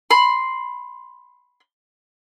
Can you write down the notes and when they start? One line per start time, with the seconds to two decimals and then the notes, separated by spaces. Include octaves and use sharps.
0.11 B5 C6